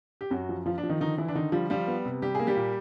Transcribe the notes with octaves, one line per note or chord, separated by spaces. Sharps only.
G4
F#2 F#3 F#4
F3
F3 F4
D4
F3
D#3 D#4
D3 D#3 D#4
D3 E3 E4
D4
D3 D#3 D#4
F3 G3 F4
F3 G3 F4
B3
C3
G3 G4
A#3 G#4
G3 G4
A#2